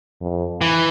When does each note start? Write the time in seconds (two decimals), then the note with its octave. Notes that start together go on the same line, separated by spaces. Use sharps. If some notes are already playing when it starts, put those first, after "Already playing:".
0.21 F2
0.61 E3